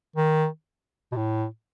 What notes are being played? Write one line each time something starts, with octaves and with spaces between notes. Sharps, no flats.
D#3
B2
A2